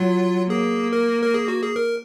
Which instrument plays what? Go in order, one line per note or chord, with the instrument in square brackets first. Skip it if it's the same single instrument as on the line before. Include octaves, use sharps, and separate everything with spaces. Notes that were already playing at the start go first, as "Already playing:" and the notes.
Already playing: [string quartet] F#3 [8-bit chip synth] F4
[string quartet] A#3 [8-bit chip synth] G#4
[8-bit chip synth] A#4
A#4
G#4
F#4
G#4
A#4